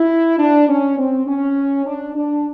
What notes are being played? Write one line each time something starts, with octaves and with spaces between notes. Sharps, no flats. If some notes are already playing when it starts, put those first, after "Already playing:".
Already playing: E4
D4
C#4
C4
C#4
D4
D4